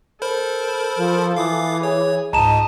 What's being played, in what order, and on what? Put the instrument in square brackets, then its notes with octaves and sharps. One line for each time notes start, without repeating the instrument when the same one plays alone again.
[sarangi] A4 [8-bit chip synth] A#4 C5 B5
[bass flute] F3
[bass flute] E3 [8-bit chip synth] F5 D6 D#6
[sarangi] G#4 [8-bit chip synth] C#5
[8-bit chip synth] C#2 G#2 [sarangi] D#5 [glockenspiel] A5 A#5 E7